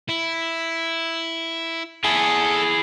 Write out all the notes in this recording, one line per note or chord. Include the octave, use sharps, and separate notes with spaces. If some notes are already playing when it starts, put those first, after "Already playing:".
E4
E4 G#4 A4